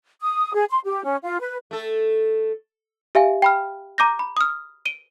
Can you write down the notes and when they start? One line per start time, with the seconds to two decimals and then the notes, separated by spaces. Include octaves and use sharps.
0.22 D#6
0.54 G#4
0.70 C6
0.85 G4
1.04 C#4
1.23 F4
1.40 B4
1.71 A3 A4
3.15 G4 E5 F5 G#5
3.42 G5 B5 F6
3.98 A#5 D6 G6 A#6
4.19 B5
4.37 D#6 F6
4.85 D7 D#7 G7